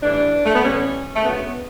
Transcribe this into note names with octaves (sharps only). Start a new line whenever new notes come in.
A2 E3 G3 D4
A3
B3
A2 E3 G3 C#4
A3
D2 C#3 F#3 B3